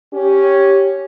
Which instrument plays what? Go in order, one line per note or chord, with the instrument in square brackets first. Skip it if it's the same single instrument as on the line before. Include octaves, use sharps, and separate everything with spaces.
[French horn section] C#4 G4